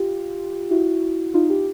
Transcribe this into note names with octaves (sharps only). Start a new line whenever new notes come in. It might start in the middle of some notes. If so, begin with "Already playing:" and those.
Already playing: F4 G4
E4 F#4
D#4 F4
F4 G4